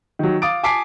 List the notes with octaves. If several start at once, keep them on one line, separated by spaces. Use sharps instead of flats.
D#3 F#3
F5 D6 D#6 A6 D7
G#5 A5 D6 B6 C7 D7